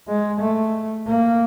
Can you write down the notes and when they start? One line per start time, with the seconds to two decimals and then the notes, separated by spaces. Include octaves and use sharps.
0.08 G#3
0.41 A3
1.07 A#3